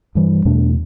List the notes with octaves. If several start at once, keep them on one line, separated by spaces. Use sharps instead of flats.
G2 E3 G3
E2 B2 A3 D4